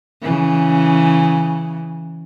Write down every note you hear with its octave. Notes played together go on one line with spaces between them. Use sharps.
C#3 E3